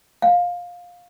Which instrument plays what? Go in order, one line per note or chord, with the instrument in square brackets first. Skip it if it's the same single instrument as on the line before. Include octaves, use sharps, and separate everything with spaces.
[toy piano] F5